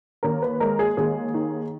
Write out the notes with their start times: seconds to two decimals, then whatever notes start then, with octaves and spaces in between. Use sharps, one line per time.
0.23 D#2 A#4
0.42 B4
0.60 G#3 A#4
0.79 G#4
0.97 D#2 G#4
1.34 D#3